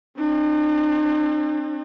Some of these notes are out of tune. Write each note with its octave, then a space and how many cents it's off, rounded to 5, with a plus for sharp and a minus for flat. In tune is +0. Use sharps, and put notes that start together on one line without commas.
C4 +40 D#4 -45